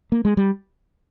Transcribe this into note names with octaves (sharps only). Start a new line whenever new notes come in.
A#3
G#3
G3